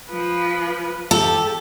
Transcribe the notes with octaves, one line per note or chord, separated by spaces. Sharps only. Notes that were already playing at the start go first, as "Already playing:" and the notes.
F3 B4
G4 A4